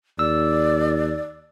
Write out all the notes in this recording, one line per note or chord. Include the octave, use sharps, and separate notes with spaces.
D#2 D5 E6